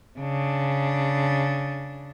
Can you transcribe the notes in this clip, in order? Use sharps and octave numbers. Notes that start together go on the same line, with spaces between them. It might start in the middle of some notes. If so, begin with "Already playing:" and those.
C#3 D4